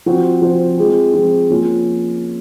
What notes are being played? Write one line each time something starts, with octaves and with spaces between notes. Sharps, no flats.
F3 C4 F#4 C5
F3 C4 F#4 C5
F3 G#3 C4
F3 G#3 C4
F3 A#3 C#4 F4